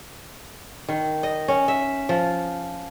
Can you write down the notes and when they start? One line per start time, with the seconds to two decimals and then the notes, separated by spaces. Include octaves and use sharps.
0.88 D#3
1.23 D#5
1.48 C#4
1.68 E5
2.09 F3